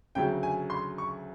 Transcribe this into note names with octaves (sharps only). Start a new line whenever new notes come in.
D2 C#3 F#3 G5
G#5
C6
C#6